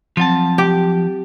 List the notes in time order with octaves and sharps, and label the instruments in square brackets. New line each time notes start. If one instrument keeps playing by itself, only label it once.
[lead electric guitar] F3 A5 [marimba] F#3 C4
[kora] G4